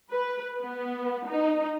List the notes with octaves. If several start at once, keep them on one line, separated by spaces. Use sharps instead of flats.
B4
B3
D#4